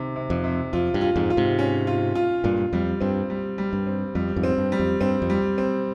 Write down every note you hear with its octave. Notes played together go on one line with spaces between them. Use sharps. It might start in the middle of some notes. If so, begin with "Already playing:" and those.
Already playing: C3 D#3
C3
F2
C3
F2 F4
G2
F4
F2 G#2
F4
G#2 C3
C#4
F4
F4
G2 A#2 F4
F2 G3
G2 C4
G3
G3
G2
C4
F2 G3
F2 G#2
C4
G2
G3
F2
G2 C4
F2
G3
C4